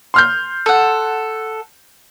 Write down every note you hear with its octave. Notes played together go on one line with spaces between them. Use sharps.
C6 F6 G6
A4 F#5